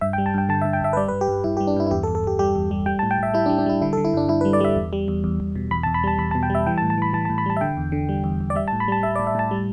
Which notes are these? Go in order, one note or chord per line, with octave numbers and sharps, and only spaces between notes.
G2 E5
G5
G3
A5
G2 G5
D3 A5
E5
G2
G5
G2 E5
B4
G3 D5
B4
G2
G4
G2
G2 E4
G4
G3
D4
G2 E4
E4
E2 G4
A4
E2
A4
E2 G4
G3 G4
E2
G3
G3 G5
A5
A2
G5
A2 E5
G3 E4
D4
G3
D4
G3 E4
D3 E4
A4
D3
E4
G2 D4
G2 E4
B4
G3
D5
G3 E5
E2
G3
E2
E2
E2
B2
E2 B5
A5
E2
B5
G3 A5
E2 B5
A5
B2
G5
G3 E5
E3 G5
A5
A2
A5
E3 B5
E3 A5
A5
A2
B5
G3 A5
E5
D3 G5
E2
D3
G3
E2
E2
D5
G3 E5
A5
A2
B5
G3 A5
G3 E5
D5
A2
E5
A2 A5
G3